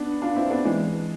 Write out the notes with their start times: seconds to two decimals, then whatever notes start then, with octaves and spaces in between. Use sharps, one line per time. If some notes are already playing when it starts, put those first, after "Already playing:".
Already playing: B3 D4
0.22 D4 F4
0.36 C4 E4
0.50 B3 D4
0.65 E3 G#3